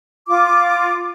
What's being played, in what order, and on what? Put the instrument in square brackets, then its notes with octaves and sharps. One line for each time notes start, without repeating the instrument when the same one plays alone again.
[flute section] F4 D6